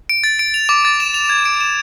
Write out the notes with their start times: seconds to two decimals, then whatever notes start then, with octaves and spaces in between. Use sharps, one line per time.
0.09 D7
0.24 A6
0.39 D7
0.54 F7
0.69 D6
0.85 A6
1.00 E7
1.14 F7
1.29 G#6
1.45 D7
1.61 E7